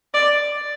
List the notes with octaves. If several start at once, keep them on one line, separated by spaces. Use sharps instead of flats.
D5